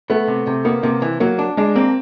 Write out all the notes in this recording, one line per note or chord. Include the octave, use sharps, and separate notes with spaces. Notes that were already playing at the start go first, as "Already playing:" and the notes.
A3 B3
C3
C3
A#3 B3
C3 A#3
E3
F#3 A#3
D4
G#3 D4
A#3 C4